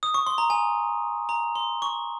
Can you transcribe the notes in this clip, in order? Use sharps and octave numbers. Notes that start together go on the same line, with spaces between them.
D#6
C#6
C6
A#5
G#5
A#5
C6
C#6